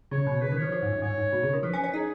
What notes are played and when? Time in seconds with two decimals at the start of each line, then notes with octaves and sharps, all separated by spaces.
0.11 C#3 C#5
0.27 B2
0.41 C#3 B4
0.52 D#3
0.58 F3 C#5
0.72 F3
0.82 G#2
0.93 F#2
1.02 G#2 C#5
1.18 G#2
1.33 B2
1.43 C#3
1.53 D#3
1.63 F3 B4
1.73 C#4
1.84 C#4
1.94 D#4 G#4